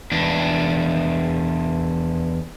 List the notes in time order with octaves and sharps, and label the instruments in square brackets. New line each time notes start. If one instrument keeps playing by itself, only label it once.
[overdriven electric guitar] E2 D4